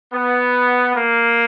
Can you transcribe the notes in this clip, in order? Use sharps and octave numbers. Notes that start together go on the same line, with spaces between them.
B3
A#3